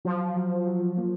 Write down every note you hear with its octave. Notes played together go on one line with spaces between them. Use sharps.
F3 F#3
F#3
F#3
A#3